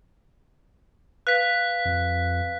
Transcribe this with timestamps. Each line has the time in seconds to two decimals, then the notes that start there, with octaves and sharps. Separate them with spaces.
1.27 B4 F5 F#6 B6
1.85 F2